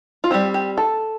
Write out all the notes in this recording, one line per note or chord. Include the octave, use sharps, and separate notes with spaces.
F4
G3 C4 G4
G4
A4